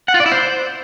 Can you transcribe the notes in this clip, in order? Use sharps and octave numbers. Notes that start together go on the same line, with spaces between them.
F#5
F4
D5
E4
C5